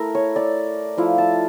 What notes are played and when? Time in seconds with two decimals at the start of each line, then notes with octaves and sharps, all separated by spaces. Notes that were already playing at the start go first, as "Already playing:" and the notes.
Already playing: A3 E4 A#4
0.15 C#5
0.36 D5
0.97 F3 A3 E4 F5
1.18 A5